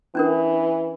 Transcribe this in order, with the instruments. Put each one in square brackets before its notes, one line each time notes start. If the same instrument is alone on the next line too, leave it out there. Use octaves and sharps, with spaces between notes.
[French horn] E3 [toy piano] C#4 D4 A#4